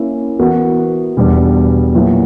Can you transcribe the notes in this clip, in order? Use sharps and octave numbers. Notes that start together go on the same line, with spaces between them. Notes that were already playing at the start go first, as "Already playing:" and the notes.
Already playing: A#3 C#4 E4 E5
E3 B3 F#4 A#4
E2 B2 G3 B3 D4
A#2 F#3 B3 E4